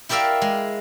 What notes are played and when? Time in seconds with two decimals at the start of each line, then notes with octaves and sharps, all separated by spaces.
0.09 E4 G4 A#4 D5 E5 F5
0.42 G#3